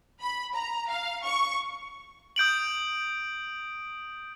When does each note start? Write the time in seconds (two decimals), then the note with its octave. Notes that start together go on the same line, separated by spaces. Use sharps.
0.20 B5
0.53 A#5
0.88 F5
1.23 C#6
2.36 D#6 G6 D7 F#7